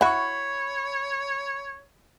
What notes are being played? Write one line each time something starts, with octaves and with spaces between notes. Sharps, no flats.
E4 F#4 C#5 B5 C#6